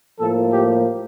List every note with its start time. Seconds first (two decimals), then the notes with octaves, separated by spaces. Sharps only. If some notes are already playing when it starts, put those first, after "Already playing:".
0.20 A2 F3 A#3 A4
0.53 G4